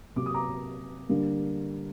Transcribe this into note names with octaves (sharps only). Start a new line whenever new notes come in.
C3 F#3 A#3 D6
D#6
A#5 D6
D3 G3 A#3 D4